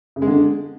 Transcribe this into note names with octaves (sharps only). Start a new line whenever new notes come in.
C#3
G#3
D3